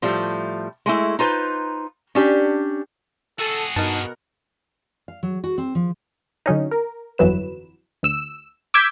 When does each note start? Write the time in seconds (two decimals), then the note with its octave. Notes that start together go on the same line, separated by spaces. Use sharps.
0.02 A2 F3 G3 A3
0.86 G#3 A3 E4
1.19 D#4 F4 B4 C5
2.15 C#4 D4 G4
3.39 F#4 G#4 A4
3.76 G2 B2 D#4 A#4 F#5 A5
5.08 F5
5.23 F#3
5.44 F#4
5.58 C4
5.75 F3
6.46 D3 F#3 C#4 D#4
6.71 A#4
7.18 G1 F2 E3 F#3 B4 E7
8.03 D2 E6 E7
8.74 D6 E6 G6 G#6 B6